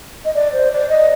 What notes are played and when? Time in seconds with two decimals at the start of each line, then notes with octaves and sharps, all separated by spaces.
0.25 D#5
0.34 D5
0.52 C5
0.71 D5
0.89 D#5